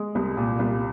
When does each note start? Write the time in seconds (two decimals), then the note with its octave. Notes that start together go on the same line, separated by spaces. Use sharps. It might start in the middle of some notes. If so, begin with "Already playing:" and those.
Already playing: G#3
0.15 C2
0.37 A#2
0.59 C2